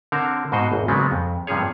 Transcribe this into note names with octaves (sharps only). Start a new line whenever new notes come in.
D3 C4 A#4 C5 C#5
G#2 B2 F#4 C5 D#5
G#1 E2
C#3 F#3 G#3 B3 C4
F2
G2 C3 F3 C#4 G#4 C#5